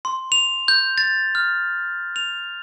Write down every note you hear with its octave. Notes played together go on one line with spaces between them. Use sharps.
C6
F7
G6
A6
F6
F7